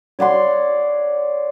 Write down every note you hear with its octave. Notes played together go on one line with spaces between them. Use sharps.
C#5 D5 F#5 C6